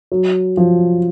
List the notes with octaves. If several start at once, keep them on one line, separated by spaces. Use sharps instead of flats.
F#3
F3